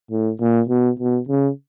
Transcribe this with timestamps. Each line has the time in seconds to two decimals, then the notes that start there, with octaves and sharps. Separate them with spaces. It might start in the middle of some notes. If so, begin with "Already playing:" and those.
0.11 A2
0.40 A#2
0.69 B2
0.99 B2
1.29 C#3